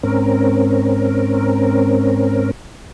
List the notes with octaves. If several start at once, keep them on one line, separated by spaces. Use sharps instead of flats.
G#2 C4 C#4 A#4